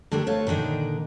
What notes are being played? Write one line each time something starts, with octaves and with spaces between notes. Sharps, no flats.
D3 A3 D4 G4 A4 A#4
A3 F4 C#5
A#2 D3 D#3 D4 D#4